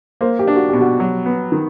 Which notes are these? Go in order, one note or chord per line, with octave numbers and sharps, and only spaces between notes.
A#3 C5
G4
D4
F#4
B2 G4
F#4
F#3
B3
D#3